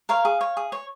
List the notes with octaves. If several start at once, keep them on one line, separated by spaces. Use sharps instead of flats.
A#4 C#5 F5
G#4
C#5
G#4
C#5